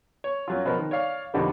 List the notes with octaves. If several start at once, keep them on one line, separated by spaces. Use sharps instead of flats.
C#5
F#2 F#3 F4
B2 F3 A#4
D#3
C#5 D5 F5
F2 B2 D3 D#3 G3